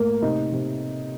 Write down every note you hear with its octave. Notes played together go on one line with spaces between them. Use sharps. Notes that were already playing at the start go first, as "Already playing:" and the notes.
Already playing: A2 A#3 A#4
C3 D#4
C3